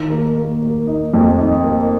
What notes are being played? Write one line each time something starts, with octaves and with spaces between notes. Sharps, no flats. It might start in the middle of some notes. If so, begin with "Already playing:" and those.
Already playing: D#3
A#3
A#3
A#3
D#4
F2
D#4
A#3